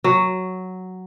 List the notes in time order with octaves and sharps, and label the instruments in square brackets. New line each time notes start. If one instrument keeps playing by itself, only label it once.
[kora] F#3